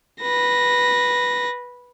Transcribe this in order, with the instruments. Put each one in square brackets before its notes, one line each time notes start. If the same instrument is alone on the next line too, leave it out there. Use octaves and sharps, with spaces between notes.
[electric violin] B4 A#6